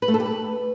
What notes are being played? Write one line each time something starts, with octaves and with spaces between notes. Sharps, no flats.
B4
A3
A4
G4
B4